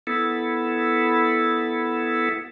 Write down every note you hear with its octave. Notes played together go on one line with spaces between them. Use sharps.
B3 E4 A4